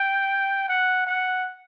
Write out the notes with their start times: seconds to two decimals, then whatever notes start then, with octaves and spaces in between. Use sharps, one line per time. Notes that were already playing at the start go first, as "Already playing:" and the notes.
Already playing: G5
0.69 F#5
1.07 F#5